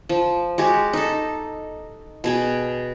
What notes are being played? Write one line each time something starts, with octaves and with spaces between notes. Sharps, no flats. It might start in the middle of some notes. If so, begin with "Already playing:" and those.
F3
G#3 F#4 G4
D#4 A4
B2 G#4 G5